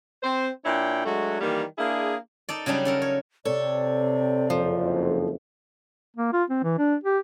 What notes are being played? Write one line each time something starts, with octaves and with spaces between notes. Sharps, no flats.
C4 C5
A#2 D4 E4 C#5 G5
F#3 G#3 A3 D4 F#4
D#3 E3 G3 A#3
A#3 D4 E4 G#4
D#4 A4 D5
C#3 F#3 G3 D4 D#4
C#4 A4 A#4
C#5
C3 C4 A4 C#5 D5
F#1 F2 F3
A#3
F4
C4
E3
D4
G4